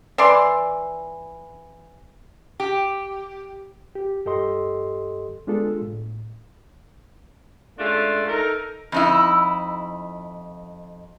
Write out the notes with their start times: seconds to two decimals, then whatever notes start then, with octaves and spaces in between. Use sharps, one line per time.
0.18 E3 D5 C6
2.60 G4
3.95 G4
4.26 G2 G4 A4 D#5 C6
5.47 G#3 B3 D4 F4 G#4 A4
5.82 A2
7.79 G#3 A3 C#4 D4 F4
8.28 D#4 A4 A#4
8.92 F2 D#4 E4